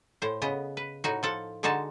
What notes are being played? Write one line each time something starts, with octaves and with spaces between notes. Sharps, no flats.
A2 C5
C#3 B3 D#5
B4
A2 D#4 F#4
F3 A4 F#5
D3 G#3 D#4 F#4 A5